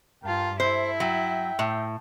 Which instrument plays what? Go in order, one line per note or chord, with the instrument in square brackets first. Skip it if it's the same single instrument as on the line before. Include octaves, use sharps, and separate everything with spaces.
[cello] G2 F4 [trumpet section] A#4 G5 A5
[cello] E4 [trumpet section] A4 E5 [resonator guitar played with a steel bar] C5
[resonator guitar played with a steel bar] F#3 [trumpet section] E5 G5
[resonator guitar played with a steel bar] A2